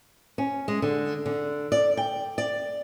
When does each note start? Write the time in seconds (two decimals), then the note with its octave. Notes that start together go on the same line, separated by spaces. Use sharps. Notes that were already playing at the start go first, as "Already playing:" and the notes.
0.38 C#4
0.68 G#3
0.82 D3
1.26 D3
1.72 D5
1.97 G5
2.38 D5